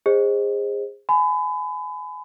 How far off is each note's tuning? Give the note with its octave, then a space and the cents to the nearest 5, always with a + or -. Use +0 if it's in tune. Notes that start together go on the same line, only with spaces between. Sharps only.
G#4 -30 C5 +15 D#5 +0
G#5 +25 B5 +30